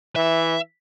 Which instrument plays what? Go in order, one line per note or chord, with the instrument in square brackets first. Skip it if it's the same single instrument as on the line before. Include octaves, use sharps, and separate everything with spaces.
[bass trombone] E3 [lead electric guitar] E5